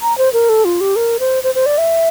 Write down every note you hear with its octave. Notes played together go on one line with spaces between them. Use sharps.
A#5
C5
A#4
A4
F4
G4
A#4
C5
C5
C5
D5
E5